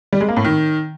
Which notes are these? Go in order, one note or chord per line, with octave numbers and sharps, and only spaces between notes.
G3
G#3
A#3
A2
D#3